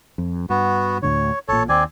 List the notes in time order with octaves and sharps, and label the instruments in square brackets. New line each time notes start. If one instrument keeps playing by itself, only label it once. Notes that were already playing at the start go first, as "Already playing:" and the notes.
[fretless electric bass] F2
[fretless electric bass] G2 [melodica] B3 F#4
[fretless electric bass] D2 A2 D3 [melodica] C#5
[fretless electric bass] A1 A#2 [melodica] A4 C#5
[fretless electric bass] D#2 [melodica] C4 D5 G#5